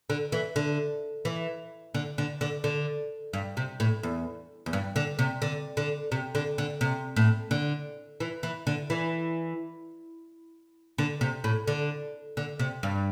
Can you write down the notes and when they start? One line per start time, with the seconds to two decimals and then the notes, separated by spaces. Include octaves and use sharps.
0.10 D3
0.32 E3
0.56 D3
1.25 E3
1.94 D3
2.18 D3
2.41 D3
2.64 D3
3.33 G2
3.57 C3
3.80 A2
4.03 E2
4.66 E2
4.73 G2
4.96 D3
5.19 C3
5.42 D3
5.77 D3
6.12 C3
6.35 D3
6.58 D3
6.81 C3
7.16 A2
7.51 D3
8.20 E3
8.43 E3
8.67 D3
8.90 E3
10.98 D3
11.21 C3
11.44 A2
11.67 D3
12.37 D3
12.59 C3
12.83 G2